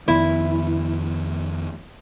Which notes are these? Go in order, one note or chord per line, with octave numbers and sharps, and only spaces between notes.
F2 D#3 B3 E4